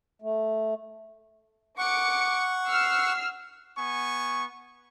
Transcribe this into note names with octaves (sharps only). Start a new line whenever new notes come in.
A3
F#5 C#6 D6 C#7
E6 F6 C7
B3 G#5 C#6